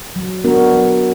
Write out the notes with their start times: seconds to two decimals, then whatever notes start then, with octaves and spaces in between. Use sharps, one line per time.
0.16 F#3
0.44 B3 D4 F#4 A#4
0.72 F#3